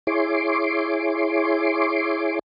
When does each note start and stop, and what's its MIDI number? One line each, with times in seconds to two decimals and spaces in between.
0.07 2.39 64
0.07 2.39 68
0.07 2.39 73
0.07 2.39 84
0.07 2.39 86